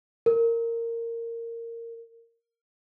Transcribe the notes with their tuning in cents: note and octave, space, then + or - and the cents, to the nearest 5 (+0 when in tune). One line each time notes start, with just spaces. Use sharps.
A#4 -15